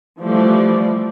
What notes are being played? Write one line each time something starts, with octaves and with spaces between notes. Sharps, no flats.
E3 F3 G3 A3 D5